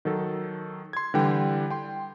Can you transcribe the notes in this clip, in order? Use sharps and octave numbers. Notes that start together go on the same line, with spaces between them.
D#3 F#3 A4
C6 G#6
D3 E3 G3 G5
G5 C6